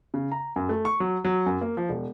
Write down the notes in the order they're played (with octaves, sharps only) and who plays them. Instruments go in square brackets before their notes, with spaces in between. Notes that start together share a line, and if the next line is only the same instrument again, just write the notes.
[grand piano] C#3
A#5
F#2
A3
C#6
F#3
F#3
F#2
A#3
F3
E1